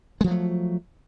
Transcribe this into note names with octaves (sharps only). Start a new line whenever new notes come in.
F3 F#3 G#3 A3